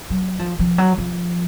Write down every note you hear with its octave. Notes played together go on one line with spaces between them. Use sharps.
F#3
F3
F3
F#3
F3